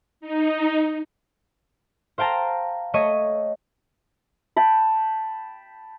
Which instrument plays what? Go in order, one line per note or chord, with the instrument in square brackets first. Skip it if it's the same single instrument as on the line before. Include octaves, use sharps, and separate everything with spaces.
[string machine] D#4
[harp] C5 F5 G5 A5 A#5
A3 C#5 D#5 D#7
[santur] G5 A5 B5